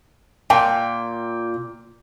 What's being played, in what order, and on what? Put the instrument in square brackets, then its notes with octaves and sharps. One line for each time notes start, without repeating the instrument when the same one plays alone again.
[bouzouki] A#2 [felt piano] G5